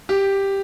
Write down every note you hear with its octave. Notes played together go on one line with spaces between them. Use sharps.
G4